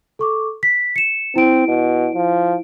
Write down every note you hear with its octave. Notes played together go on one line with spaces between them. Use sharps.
A4 C#6 D6
B6
C#7 E7
C4 E4 D7
B2
F3